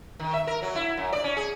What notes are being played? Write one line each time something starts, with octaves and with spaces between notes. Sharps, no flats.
D#3
E5
A#4
F#3
E4
F#2
D5
C#4
G#4